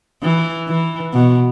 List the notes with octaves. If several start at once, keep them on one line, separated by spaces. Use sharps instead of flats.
E3
E3
B2